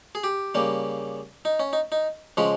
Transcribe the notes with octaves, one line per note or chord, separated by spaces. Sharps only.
G#4
G4
C#3 G3 A#3
D#4
C#4
D#4
D#4
C#3 F3 G#3 C#4